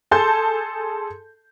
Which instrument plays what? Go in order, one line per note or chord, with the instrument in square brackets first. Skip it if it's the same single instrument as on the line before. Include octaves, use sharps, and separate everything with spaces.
[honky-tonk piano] G#4 A4 A5 C6 G6